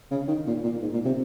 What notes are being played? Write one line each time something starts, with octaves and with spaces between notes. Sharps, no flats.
C#3
D#3
A#2
A#2
G#2
A#2
C3